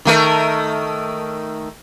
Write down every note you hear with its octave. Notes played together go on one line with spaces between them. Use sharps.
D#3 A3 A#4